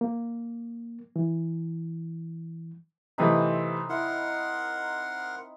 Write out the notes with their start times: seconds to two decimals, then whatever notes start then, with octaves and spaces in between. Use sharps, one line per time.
0.01 A#3
1.16 E3
3.18 C3 E3 A3 C4 D#4 B5
3.89 E4 A#4 F#5 C6